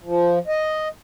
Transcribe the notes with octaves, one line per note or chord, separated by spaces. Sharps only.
F3
D#5